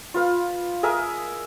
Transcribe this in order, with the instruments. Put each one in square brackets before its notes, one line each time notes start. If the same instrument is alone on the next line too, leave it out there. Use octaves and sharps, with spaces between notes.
[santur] F4 B4 F5
G#4 A#4 D#5 E5